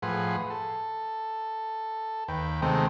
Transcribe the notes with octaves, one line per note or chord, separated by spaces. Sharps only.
A2 F3 G#4 B4 F#5 C6
A4
D#2 B4 G5
C3 D#3 G#3 A3 B3 C4